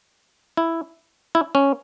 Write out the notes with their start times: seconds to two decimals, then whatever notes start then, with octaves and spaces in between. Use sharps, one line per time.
0.57 E4
1.35 E4
1.55 C#4